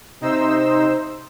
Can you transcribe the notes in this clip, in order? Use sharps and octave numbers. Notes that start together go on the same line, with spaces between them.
C3 D#4 C5 E6